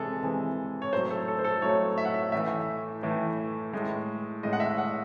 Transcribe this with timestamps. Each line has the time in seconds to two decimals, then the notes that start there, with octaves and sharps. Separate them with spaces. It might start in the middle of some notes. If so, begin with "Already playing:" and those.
Already playing: C3 E3 G#3 G#4 A4
0.23 C3 E3 G#3
0.82 C#5
0.93 A2 F#3 A3 C5
1.11 A4
1.28 A4
1.39 C5
1.44 A4
1.62 A2 F#3 A3 C#5
1.98 E5
2.05 F#5
2.14 E5
2.32 A2 E3 A3 E5
3.03 A2 E3 A3
3.73 A2 G#3
4.43 A2 G#3 D#5
4.53 F#5
4.60 E5
4.78 F#5